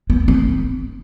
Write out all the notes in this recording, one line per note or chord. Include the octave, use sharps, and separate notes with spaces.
B3
C4